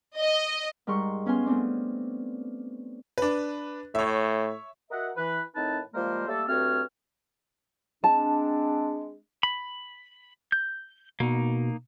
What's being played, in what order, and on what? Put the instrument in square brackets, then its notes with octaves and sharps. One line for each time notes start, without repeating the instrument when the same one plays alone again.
[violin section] D#5
[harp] G#2 G3 A#4 C6 C#6
B3 C#4 F4 G#5 C6
A3 B3 C4 D4
[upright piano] D4 B4
[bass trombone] A2 [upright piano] C#5 E5
[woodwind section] F#4 A#4 D#5 E5 F#5
E3 B4
A2 D#3 C4 D#4 B4 A5
F3 G3 G#3 A#3 A#4 C5
G3 A3 A#3 A4
G2 A3 C4 F#4 C#5 F6
[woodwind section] G#3 C4 D4 [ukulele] A5
[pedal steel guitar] B5
G6
[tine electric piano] B2 [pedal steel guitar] A#3 D#4